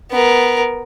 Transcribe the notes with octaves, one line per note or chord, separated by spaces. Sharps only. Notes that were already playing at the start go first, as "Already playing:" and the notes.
B3 A#4